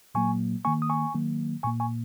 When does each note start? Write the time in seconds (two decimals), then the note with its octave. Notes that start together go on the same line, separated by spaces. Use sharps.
0.15 A#2 F#3 A#3 G#5 C#6
0.65 D#3 A#3 G#5 C#6
0.82 D#6
0.90 G#5 C#6
1.14 D#3 F#3 A#3
1.63 A#2 A#3 G#5 C#6
1.80 G#5 C#6